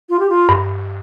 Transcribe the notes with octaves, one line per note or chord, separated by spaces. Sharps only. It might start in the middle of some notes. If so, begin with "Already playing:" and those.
F4
G4
F4
G2